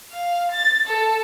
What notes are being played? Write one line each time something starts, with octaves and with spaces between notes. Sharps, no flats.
F5
A6
A4